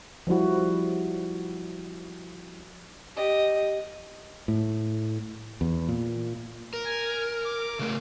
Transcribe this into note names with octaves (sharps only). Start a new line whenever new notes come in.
F3 G3 E4 F#4
G4 D#5
A2
E2
A#2
A#4
G#5
D6
C#3 A3 A#4